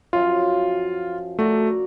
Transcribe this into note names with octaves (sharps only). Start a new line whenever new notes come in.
F#2 F3 F4 F5
A3 F#4 A#4 D5